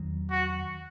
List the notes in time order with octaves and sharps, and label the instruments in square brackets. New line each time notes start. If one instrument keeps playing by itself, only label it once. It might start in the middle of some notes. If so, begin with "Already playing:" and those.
Already playing: [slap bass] E2 D#3 F#3
[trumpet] F#4